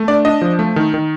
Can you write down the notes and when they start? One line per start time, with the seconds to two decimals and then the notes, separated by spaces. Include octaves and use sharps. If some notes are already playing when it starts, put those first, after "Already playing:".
Already playing: A3
0.08 D4 D5
0.25 D4 D#5
0.42 F3
0.59 A3
0.76 D#3
0.94 D#3